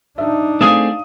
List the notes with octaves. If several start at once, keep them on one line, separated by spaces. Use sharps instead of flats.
D4 D#4 E5
A3 C4 G#4 F5 D#6